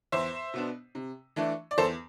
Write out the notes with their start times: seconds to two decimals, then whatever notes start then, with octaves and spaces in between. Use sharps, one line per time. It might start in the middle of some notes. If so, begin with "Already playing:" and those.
0.12 E2 C5 E5
0.54 B2 B3 D4
0.95 C3
1.36 E3 A3 D4
1.71 D5
1.78 E2 A4 C5